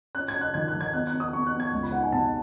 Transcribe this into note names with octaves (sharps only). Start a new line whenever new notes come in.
C#4 F#6
G#6
C#4
F#6
D#3 G#6
F#6
D#3
G#6
B3 F#6
F#6
B3
D#6
B3 C#6
F#6
B3
G#6
C#2
B5
D#4 F#5
G#5
B2 A5